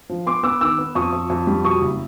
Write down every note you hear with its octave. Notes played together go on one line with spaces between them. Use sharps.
F3
B3 C6 D6
B3 D6 E6
D#3 D6 E6
B3
F2 C#6 D#6
F2
F2
G3
B2 C#6 D#6
F#1